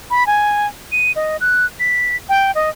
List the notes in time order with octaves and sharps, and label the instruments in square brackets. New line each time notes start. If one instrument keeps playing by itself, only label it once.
[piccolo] B5
G#5
D#7
D#5
F#6
B6
G5
D#5